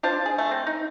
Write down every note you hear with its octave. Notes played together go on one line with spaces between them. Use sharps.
D4 F4 C5 A5
G#4
A3
C4
D#4